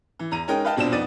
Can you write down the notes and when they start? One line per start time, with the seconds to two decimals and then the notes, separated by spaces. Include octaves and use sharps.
0.19 E3
0.31 E2 A#5 D#7
0.48 G#3 C#4 D#4 A#4 D#5 G5
0.65 B4 D#5 F5 G5 A5
0.77 D#1 B2 C4 D4 F4 E7
0.92 F2 B3 D#4 D5 A6 D#7